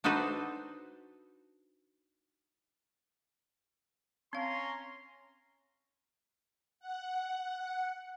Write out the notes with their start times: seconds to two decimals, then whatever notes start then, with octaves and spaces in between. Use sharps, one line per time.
0.04 D4 D#4 F#4 A4 B4 C5
4.33 C4 C#4 F5 A#5 C6
6.80 F#5